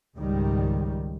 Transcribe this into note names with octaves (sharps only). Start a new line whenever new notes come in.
C#2 G#2 D#3 G3